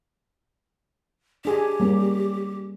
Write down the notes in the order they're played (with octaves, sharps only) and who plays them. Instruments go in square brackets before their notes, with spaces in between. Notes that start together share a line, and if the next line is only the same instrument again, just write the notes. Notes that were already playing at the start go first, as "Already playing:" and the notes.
[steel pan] D4 G#4 [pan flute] G4
[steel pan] G3 A#3 C#4